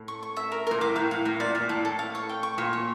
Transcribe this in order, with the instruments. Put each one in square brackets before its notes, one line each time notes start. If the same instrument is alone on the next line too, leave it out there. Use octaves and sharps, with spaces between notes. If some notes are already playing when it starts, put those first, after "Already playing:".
Already playing: [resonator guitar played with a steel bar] A2
[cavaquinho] C#6
C#6
E5
A#4
[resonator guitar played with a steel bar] A#2 [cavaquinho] A#4
[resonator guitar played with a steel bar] A2 [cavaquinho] D6
[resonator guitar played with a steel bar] A2 [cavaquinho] F5
[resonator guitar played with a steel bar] A2 [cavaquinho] F5
[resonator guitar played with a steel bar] A2 [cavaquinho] A#4
[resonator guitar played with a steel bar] A#2 [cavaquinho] D5
[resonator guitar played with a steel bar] A#2 [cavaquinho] D5
[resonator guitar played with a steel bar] A2 [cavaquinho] A4
[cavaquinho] A4
F5
C#5
G5
C#6
[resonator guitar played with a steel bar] A#2 [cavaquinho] C#5
[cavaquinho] C#5